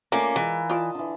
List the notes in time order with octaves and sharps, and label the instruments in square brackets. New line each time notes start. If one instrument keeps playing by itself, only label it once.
[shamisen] A3 [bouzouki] A#3 C#4 [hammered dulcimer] F4 A#4 D5
[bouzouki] E3 [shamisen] G#3
[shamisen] F4 D5 [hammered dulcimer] D#5 A5
[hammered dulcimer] D3 E3